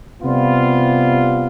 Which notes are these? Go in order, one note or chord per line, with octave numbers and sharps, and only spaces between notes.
C3 G3 B3 F4